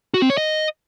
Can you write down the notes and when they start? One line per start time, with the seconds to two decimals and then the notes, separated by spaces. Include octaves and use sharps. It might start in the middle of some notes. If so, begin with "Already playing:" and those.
0.14 F#4
0.22 C4
0.30 C#5
0.38 D#5